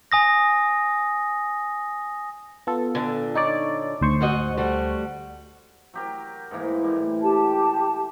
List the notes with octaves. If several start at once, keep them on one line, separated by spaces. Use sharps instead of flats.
G#5 D#6 A#6
B3 F4 A4
A#2 D3
D#4 C#5 D5
D2 C5 C#6
G#2 F#4 D#5
G3 A3 F#4
F#3 G4 A#4
G#2 E3 A#3
A2 G3
G4 A5